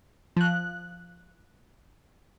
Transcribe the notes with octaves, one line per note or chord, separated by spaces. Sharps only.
F3 F#6